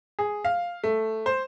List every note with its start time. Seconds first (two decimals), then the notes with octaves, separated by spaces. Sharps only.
0.19 G#4
0.45 F5
0.84 A3
1.26 C5